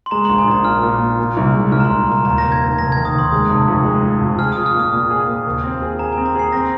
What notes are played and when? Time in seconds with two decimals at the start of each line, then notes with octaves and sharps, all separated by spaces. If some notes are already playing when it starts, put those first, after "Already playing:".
0.06 C6
0.11 G#3 A#5
0.25 C6
0.29 A#1
0.38 G#5
0.47 A#1 A#5
0.65 A#2 F6
0.83 A#2
1.00 A#2
1.19 A#2
1.37 C2
1.54 G#3
1.72 C2 F6
1.80 A#5
1.85 C6
1.89 C2
2.08 A#2 A#5
2.25 D#2 A#5
2.38 A#6
2.43 F1
2.52 G#6
2.60 F1
2.79 F1 A#6
2.92 G#6
2.96 D#3
3.05 D#6
3.14 D#2 C6
3.32 G#3 D#6
3.50 F1
3.68 F2
3.85 G#3
4.03 F3
4.21 F2
4.39 G#4 F6
4.52 D#6
4.57 F4
4.66 F6
4.75 A#2 D#6
4.92 A#2
5.10 G#4
5.28 A#3
5.46 D#2
5.64 C4
5.82 G#4
5.99 G#4 A#5
6.13 G#5
6.17 C4
6.26 A#5
6.35 G#4 C7
6.52 C4 A#6